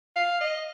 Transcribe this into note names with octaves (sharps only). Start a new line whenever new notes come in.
F5
D#5